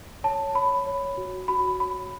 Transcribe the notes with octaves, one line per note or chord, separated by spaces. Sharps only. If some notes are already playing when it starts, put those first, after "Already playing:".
C#5 A5
C#5 B5
C#5
F#4
F#4 B5
C#5 B5